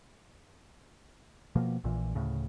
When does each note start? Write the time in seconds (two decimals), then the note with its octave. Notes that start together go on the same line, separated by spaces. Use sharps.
1.55 B2 F3 A#3
1.84 A#1 A#2 E3
2.15 D2 A2 C#3